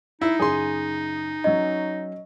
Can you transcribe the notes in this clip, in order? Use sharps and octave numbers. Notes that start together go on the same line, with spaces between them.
D#4 E4
F#2 C#3 G#4 C6
F#3 C#4 D#5